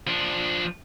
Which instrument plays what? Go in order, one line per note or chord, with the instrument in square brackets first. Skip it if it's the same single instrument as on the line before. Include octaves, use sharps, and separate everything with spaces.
[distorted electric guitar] F3 D4